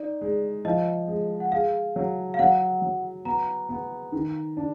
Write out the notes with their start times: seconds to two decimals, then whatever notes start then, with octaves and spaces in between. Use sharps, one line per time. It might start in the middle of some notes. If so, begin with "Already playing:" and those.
Already playing: D#4 D5
0.21 G#3
0.65 F3 D#5
1.08 G#3
1.40 F#5
1.51 G#4 F5
1.96 F#3
2.34 F5
2.39 F#3 F#5
2.82 F#3
3.25 B3 A#5
3.69 B3
4.12 D#3
4.57 D4